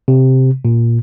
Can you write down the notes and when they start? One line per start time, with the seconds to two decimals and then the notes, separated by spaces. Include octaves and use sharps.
0.08 C3
0.65 A#2